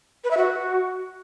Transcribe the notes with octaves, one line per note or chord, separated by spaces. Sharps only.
B4
E5
F#4